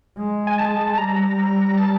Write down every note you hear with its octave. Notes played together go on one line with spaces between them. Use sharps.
G#3
G#5
A5
G3 A#5
A5